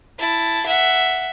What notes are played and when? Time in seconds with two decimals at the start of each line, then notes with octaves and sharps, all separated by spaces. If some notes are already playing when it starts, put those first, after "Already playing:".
0.19 E4 A5
0.66 E5 F#5